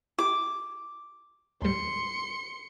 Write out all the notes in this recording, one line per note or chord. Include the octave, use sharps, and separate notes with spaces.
E4 G4 D6
D#2 A2 G3 C6 C#7